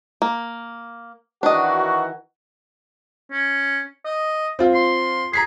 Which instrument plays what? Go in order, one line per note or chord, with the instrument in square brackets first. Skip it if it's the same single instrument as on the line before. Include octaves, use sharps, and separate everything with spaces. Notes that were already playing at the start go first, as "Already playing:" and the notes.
[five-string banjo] A#3
[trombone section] D#3 E3 F#4 [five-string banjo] D4 D#5
[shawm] C#4
D#5
[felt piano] C4 F4
[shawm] C6
[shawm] G#4 [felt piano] A#5 B6 C7